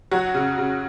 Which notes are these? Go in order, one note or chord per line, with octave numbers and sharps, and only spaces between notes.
F#3 F#4
C#3
C#3